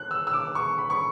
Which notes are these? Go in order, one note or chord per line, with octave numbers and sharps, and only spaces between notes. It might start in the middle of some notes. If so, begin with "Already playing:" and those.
Already playing: F#6
E6
E6
D6
C#6
B5
C#6